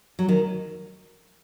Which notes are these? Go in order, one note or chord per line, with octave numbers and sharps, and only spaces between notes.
F#3
D#3